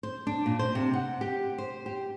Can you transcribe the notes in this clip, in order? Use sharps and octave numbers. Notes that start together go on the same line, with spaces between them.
C5
D4
A#2
C5
C3
F#5
G4
C5
G4